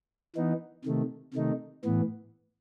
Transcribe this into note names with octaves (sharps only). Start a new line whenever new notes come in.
E3 B3 D#4
C3 D#3 A3
C3 D#3 A3 D#4
A2 E3 B3